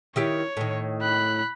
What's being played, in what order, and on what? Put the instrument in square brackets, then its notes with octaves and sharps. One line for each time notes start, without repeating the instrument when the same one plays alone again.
[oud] D#3 E4 G4 [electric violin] C#5
[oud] A2 D#3
[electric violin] B5 F#6